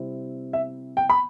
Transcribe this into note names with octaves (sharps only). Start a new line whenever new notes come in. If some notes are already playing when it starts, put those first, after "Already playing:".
Already playing: C3 G3 C4 E4
E5
G5
B5